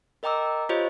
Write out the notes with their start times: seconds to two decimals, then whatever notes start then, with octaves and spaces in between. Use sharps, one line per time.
0.23 A#4 D#5 G5 A#5 D6 E6
0.69 F4 G4 C5 C#5 D#5 F5